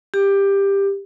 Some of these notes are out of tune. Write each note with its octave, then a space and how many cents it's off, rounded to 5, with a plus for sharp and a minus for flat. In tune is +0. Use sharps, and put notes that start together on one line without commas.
G4 +15